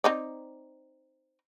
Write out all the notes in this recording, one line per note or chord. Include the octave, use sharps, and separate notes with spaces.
C4 D#4 D5